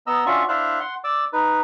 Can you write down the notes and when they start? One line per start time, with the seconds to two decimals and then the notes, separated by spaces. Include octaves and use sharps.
0.07 B3 D#5 A#5 E6
0.26 C#4 D4 F4 F#4 E5 C#6
0.49 D4 E4 C5 E5 F5 F#6
0.80 F#5 C6
1.04 D5 D6 E6
1.33 D#4 B4